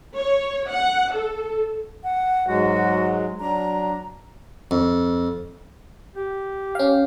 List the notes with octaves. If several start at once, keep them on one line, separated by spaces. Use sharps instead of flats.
C#5
F#5
A4
F#5
G#2 F#3 G#3 F#4
F#3 D4 A#5
F2
G4
C#4 F5